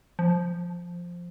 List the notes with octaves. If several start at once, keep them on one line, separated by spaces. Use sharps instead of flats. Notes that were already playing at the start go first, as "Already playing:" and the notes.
F3